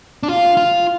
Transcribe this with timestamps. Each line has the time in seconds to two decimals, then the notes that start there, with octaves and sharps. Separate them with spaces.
0.23 D4
0.28 F4 F5
0.57 F4